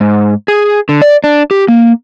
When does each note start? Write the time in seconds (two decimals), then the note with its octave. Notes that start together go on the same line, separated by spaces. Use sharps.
0.01 G#2
0.48 G#4
0.89 D3
1.02 D5
1.24 D4
1.51 G4
1.68 A#3